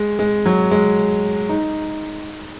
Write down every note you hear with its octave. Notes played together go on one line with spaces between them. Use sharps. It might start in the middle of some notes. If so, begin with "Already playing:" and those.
Already playing: G#3
G#3
F#3
G#3
D#4